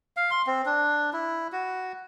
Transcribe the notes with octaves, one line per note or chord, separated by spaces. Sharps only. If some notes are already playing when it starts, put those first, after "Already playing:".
F5
C6
C4
D4
E4
F#4